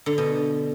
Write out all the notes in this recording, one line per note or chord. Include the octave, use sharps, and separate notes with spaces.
D3
B2